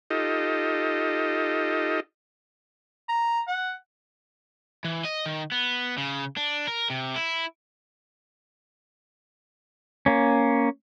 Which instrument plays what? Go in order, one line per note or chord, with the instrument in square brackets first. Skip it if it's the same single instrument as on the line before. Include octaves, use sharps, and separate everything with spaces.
[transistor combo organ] D#4 F4 G4 A4 D#5
[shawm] A#5
F#5
[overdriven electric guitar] E3
D#5
D#3
B3
C#3
D4
A#4
C3
E4
[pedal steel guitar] A#3 C#4